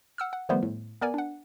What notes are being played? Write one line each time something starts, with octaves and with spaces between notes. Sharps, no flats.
F#5 E6 F6
F#5
D#3 F3 G3 A3 B3 C5
A2
B3 A#4 D5 G#5
D4 F#5